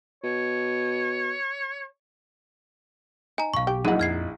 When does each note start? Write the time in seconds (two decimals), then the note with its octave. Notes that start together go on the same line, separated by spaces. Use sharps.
0.24 B2 C#5
3.38 D#4 G#5 A#5
3.54 B1 G2 F5 C#6
3.67 G4 G5
3.85 A#1 F#3 G#3 D#4 E4 G#4 F#5
3.99 F2 F6 G#6 C7